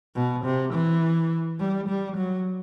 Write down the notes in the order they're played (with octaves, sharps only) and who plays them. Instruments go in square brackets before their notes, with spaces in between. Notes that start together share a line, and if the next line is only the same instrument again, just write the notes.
[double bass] B2
C3
E3
G3
G3
F#3